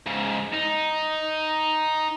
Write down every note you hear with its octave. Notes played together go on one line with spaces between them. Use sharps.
G#2 C#3
D#4